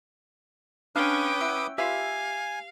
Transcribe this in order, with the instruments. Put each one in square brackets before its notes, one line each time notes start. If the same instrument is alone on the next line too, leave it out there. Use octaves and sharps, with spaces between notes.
[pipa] G#3 F5 [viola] C#4 G5 [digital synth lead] D4 [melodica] B4 D6 D#6
[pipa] E4 F#5 [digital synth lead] E6
[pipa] F4 B4 E5 [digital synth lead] G4 [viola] F5 [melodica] G#5